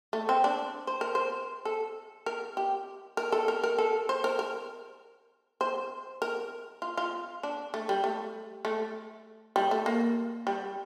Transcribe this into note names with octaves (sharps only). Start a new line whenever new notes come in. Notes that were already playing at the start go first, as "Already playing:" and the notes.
A3
C4
D4
C5
A#4
C5
A4
A#4
G4
A#4
A4
A#4
A#4
A4
C5
A#4
A#4
C5
A#4
F4
F4
D4
A3
G3
A3
A3
G3
A3
A#3
G3